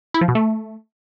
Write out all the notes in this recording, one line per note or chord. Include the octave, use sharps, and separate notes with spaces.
E4
F3
B2
A3